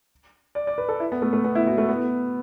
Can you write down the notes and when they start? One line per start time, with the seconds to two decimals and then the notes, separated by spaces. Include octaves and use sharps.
0.55 D5
0.67 D5
0.78 B4
0.89 A4
1.00 E4
1.12 B3
1.22 A3
1.33 A3
1.44 B3
1.55 E4
1.67 F#4
1.78 A3
1.89 B3